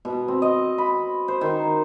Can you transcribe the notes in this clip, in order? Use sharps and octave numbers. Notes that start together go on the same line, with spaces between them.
B2
C4
D#5
B5
C5
D#3